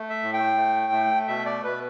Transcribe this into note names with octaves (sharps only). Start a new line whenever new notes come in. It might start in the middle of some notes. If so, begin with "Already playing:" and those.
Already playing: A3
E5
A2
G5
A3
A3
B2 E5
D5
B2 B4